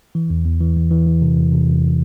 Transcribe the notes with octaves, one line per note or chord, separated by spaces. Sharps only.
E3
E2
E2
E3
E2
E3
E3
C3
E2
C3
E2